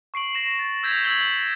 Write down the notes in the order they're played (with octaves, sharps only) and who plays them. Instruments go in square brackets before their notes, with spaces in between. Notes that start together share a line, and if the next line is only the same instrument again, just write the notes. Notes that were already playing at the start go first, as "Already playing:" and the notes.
[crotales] C#6 C7 D7 F#7
A#6 E7
A6
E6 G6 G#6 B6 E7 F7
E6 G#6 B6 F#7 G7